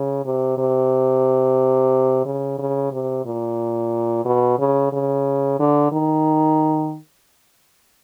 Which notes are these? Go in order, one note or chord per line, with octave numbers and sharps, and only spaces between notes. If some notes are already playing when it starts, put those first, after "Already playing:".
Already playing: C#3
C3
C3
C#3
C#3
C3
A#2
B2
C#3
C#3
D3
D#3